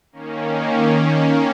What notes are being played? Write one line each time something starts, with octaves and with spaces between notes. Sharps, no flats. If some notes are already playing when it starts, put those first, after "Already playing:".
D#3 A#3 C#4